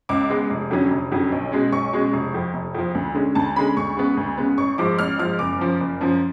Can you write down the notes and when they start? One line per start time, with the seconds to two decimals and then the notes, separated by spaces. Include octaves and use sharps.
0.09 C#2 D6
0.30 C#3 G#3 B3
0.50 F1
0.71 F2 D3 F#3 C#4
0.91 F1
1.11 F2 D3 F#3 C#4
1.32 B1
1.52 B2 G#3 C#4
1.72 B1 C#6
1.93 B2 G#3 C#4
2.13 F1
2.33 F2 F3
2.54 F1
2.74 F2 F3
2.95 D2
3.14 D3 G#3 C#4
3.35 D2 A5
3.56 D3 G#3 C#4 B5
3.77 D2 C#6
3.97 C#3 G#3 B3
4.17 D2
4.38 C#3 G#3 B3
4.58 A1 C#6
4.78 G#2 F3 D6
4.99 A1 F6
5.19 G#2 F3 F6
5.39 F#1 D6
5.59 F#2 F3
5.81 F#1
6.01 F#2 F3